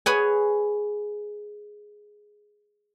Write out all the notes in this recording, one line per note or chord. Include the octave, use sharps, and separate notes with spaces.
G#4 B4 C#5 F#5 G#5